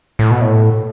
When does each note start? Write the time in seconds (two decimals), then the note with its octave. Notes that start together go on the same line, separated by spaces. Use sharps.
0.19 A2
0.31 B2
0.41 A2